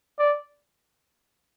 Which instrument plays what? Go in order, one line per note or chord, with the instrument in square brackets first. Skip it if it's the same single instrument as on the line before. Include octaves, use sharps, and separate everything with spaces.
[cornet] D5